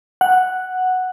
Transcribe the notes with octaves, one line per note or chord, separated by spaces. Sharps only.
F#5